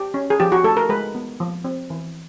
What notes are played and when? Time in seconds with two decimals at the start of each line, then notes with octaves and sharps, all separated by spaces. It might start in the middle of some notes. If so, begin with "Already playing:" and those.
Already playing: G4
0.14 C#4
0.30 G#4
0.40 F3 G4
0.52 F#4
0.64 A3 A4
0.77 A#4
0.89 G#3 B4
1.15 B3
1.40 F3
1.64 C4
1.90 E3